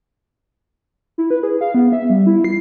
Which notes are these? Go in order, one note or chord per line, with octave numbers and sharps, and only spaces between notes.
E4
B4
G#4
F5
B3
E5
G3
E4
C7